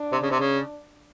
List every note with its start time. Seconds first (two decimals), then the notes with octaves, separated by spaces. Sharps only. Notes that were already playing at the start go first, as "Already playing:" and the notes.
Already playing: D4
0.12 C3
0.22 C#3
0.31 C3
0.40 C#3